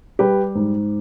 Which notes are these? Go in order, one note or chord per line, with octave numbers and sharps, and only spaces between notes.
G3 G4 B4
G#2